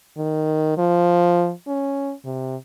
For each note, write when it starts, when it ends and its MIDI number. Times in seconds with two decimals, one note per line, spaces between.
0.17 0.75 51
0.77 1.52 53
1.67 2.13 61
2.25 2.56 48